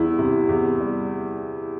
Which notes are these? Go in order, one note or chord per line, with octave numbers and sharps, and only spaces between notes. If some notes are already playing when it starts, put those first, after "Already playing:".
Already playing: E2 G3 E4
C3
E2
G3